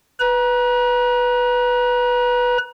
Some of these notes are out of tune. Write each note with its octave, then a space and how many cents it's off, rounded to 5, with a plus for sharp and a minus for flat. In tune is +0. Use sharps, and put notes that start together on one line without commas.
B4 +0 A#5 +35